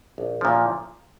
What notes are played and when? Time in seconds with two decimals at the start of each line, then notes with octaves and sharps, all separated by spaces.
0.18 A#1
0.41 A#2 F3